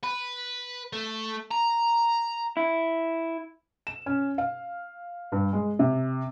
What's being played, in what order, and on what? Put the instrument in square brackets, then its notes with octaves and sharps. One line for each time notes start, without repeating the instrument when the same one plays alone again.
[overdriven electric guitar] B4
A3
A#5
[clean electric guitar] E4
[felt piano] E7
C#4
F5
G2
G#3
C3